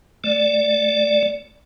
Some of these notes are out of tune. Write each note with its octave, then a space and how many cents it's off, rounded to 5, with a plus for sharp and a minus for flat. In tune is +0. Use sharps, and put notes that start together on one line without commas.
A3 +0 D5 +0